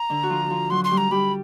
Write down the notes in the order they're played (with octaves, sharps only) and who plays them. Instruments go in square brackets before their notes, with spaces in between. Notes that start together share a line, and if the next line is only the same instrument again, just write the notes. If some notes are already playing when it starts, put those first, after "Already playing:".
Already playing: [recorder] A#5
[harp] D3 D4
F#4
F3 F4
F3 F4
[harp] F#3 F#4 [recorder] C6
[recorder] C6
[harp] G3 G4
[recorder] A#5
[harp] G3 G4 [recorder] B5